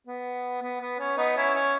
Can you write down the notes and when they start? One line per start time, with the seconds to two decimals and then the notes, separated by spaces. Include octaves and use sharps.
0.07 B3
0.62 B3
0.81 B3
0.99 C#4
1.18 B3 D#4
1.36 C#4 E4
1.55 C#4